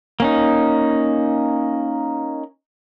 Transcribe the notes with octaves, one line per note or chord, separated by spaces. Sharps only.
A#3 C#4 D#4